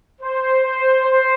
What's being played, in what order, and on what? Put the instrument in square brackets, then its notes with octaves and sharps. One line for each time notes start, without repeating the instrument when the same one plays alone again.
[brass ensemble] C5
C5
C5